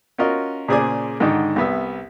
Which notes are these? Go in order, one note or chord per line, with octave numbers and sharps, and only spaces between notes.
C#4 F4 F#4 A#4 D#5
A#2 C#3 G#4 C5 D5 G#5
G#2 D3 D#3 D#4
C2 B3 E5